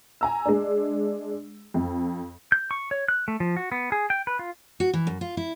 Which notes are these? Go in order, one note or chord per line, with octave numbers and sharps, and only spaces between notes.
G#5 A#5 E6
G#3 D4
F2
G6
C#6
C#5
F#6
A3
F3
F#4
B3
G#4
G5
B4
F4
F#4
E3
F#2
F4
E4